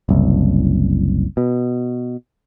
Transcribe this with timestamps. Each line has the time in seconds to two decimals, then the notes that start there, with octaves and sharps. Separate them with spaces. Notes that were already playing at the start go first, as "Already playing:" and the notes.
0.09 F#1 C2
1.37 B2